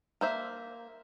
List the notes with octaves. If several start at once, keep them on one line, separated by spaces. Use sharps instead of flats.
A#3 C5 E5